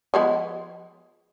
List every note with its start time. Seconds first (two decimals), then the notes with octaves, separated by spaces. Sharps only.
0.14 F3 G#3 B3